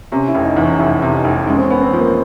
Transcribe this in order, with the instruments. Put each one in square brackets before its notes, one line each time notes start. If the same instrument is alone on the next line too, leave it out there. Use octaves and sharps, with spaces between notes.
[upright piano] C3 [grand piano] C#4
[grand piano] E4
[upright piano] F1
[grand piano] D#4
[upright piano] E2
[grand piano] C#4
[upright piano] F1 [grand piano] E4
[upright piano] C3
[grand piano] D#4
[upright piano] F1
[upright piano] G#3 [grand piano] C#4
[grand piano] C4
C#4
[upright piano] B3
[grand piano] C4
[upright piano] F3
[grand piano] A#3